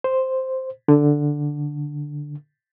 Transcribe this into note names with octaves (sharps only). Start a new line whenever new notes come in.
C5
D3